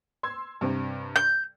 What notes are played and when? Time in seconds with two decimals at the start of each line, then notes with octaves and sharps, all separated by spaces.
0.23 C6 E6 G#6
0.61 G2 C3 C4
1.16 G6